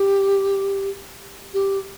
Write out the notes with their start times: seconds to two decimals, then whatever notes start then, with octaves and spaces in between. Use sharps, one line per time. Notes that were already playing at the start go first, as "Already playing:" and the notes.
Already playing: G4
1.53 G4